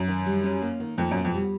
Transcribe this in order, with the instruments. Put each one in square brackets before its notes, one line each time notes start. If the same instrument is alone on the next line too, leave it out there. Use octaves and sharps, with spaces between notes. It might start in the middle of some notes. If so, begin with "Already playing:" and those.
Already playing: [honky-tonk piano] F#2
[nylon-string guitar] D#3
G3
C#4
A#3
D#3
[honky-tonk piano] F2 [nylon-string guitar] A#3
[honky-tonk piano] F#2 [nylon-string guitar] B2
[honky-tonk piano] F2
[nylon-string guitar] G3